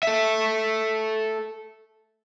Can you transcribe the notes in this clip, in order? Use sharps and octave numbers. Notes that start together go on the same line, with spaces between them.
A4 E5